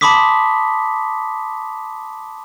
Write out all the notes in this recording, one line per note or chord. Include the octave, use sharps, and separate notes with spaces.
A5 B5 C6 D6 D#6 B6